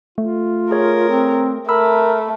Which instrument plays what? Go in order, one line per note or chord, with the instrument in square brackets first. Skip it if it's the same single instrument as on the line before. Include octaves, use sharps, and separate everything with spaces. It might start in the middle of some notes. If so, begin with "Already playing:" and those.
[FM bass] A3 [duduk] F4
[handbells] G#4 C#5 [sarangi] A#4
[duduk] C4
[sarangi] A3 [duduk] A#4 [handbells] B5 E6